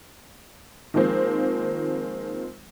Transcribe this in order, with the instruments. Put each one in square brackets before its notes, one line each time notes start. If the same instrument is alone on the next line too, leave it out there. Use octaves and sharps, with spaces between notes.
[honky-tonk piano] D#3 F3 G#3 A#3 C4